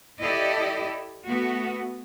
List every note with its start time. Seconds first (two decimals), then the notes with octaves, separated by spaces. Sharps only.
0.20 E4 G4 A4 D5 D#5
1.26 A3 B3 F#4